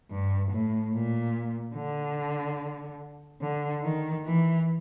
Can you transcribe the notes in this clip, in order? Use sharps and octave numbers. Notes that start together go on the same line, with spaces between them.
G2
A2
A#2
D3
D3
D#3
E3